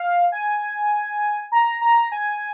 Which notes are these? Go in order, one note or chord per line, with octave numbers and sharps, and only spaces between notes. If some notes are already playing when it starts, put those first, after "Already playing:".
Already playing: F5
G#5
A#5
A#5
G#5